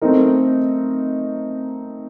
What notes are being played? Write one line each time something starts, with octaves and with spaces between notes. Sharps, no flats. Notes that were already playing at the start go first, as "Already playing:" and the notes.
A3 C4 D#4 A#4